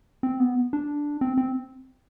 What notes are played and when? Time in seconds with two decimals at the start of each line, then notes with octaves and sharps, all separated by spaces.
0.23 C4
0.40 B3
0.73 D4
1.21 C4
1.38 C4